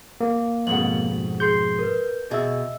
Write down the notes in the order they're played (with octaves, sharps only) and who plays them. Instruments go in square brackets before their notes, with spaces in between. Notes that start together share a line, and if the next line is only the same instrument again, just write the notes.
[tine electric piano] A#3
[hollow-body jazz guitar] F2 G#2 B2 [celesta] F#5 F#7
[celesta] G#4 C6 C7 [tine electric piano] G6
[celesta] A#4 B4
[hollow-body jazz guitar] B2 G#4 [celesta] D#5 E5 E6